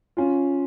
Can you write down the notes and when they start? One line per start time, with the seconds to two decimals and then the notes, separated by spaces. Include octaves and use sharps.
0.17 C#4 F4